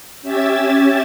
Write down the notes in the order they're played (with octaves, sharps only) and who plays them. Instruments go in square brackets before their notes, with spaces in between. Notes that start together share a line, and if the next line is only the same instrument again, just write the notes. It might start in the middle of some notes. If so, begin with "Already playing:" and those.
[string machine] C#4 G4 E5 E6 G#6 A6